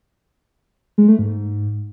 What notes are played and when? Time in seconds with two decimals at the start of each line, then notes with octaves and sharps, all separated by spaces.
0.98 G#3
1.08 A3
1.19 G#2